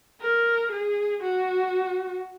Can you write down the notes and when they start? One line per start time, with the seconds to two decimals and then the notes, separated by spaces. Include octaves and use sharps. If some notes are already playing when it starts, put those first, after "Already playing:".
0.22 A#4
0.72 G#4
1.22 F#4